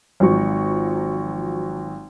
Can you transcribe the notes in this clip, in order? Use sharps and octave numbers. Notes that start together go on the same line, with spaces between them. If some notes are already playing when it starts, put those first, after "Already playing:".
G#1 F3 F#3 C#6